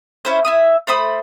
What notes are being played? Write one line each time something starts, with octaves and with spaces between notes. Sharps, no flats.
C#4 E4 C5
E4 E5 D#6
A3 C5 B5 D#6